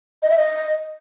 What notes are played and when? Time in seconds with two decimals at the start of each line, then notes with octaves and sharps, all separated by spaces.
0.23 D#5
0.30 E5
0.38 D#5